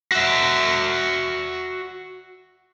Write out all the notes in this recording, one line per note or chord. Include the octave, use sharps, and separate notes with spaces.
F#4 E5